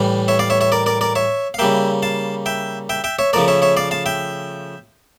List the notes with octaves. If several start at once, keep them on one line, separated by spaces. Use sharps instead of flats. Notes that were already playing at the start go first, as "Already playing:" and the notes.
Already playing: A2 E3 G3
C#5 E5
D5 F5
C#5 E5
C#5 E5
A#4 D5
A#4 D5
A#4 D5
C#5 E5
F5
C#3 G3 A#3 E5 G5
F5 A5
E5 G5
E5 G5
E5 G5
C#5 E5
C#3 F3 A3 A#4 D5
C#5 E5
C#5 E5
D5 F5
F5 A5
E5 G5